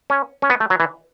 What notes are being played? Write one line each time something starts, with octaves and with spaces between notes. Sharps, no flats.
C#4
C#4
B3
A3
F#3
E3